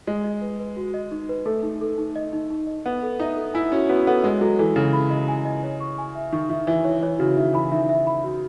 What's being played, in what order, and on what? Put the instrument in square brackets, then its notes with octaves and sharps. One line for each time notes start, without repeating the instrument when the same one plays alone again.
[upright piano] G#3 [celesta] D#5
[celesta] D#5
B4
B4
F#4
D#5
D#4
B4
[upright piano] A3 [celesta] A4
[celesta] D#4
A4
D#4
D#5
D#4
D#4
D#5
[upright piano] B3 [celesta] A4
[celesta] A4
[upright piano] D#4 [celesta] E5
[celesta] A4
[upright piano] E4 [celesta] G#5
[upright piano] C#4 [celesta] F#4
[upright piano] B3 [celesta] F#4
[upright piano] B3 [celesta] A4
[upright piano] G#3 [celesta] D#5
[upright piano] F#3 [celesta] A4
[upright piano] E3 [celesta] A4
[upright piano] C#3 [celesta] A4
[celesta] B5
D#5
G#5
D#5
C#5
C#6
G#5
E5
[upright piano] D#3 [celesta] C#6
[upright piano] D#3 [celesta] E5
[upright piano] E3 [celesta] E5
[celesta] C#5
[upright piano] E3 [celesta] C#5
[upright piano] C#3 [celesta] F#4
[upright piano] D#3 [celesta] E5
[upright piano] E3 [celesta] B5
[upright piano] D#3 [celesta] E5
[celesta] E5
B5
F#4